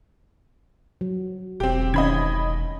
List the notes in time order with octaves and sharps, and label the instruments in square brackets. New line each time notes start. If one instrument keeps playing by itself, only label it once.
[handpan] F#3
[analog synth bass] E1 [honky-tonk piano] C4 G4
[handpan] D#3 C#4 [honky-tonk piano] D#5 B5 G#6